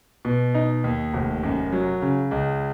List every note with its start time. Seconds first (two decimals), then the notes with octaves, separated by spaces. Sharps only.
0.25 B2
0.55 D#4
0.84 D#2
1.14 F1
1.43 F#2
1.72 F#3
2.02 C#3
2.31 C#2